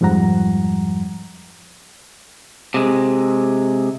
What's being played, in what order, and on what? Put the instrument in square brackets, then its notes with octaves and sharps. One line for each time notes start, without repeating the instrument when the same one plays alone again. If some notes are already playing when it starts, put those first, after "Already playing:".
[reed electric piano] F2 G#2 F3 G3 F#5 A#5
[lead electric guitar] C3 G#3